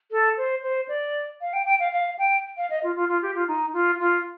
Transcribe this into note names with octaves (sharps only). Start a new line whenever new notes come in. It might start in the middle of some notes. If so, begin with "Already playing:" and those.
A4
C5
C5
D5
F5
G5
G5
F5
F5
G5
F5
D#5
F4
F4
F4
G4
F4
D#4
F4
F4